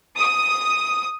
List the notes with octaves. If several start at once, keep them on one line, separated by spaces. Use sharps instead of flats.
D#6